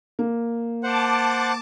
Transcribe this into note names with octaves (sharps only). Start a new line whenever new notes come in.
A#3
C5 F#5 A5 D6